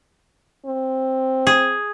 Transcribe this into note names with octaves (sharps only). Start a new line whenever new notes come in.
C4
G#4